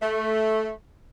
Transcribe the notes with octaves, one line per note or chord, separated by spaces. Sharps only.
A3